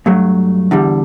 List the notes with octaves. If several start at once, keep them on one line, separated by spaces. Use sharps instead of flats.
G2 F#3 A3
E2 D3 G3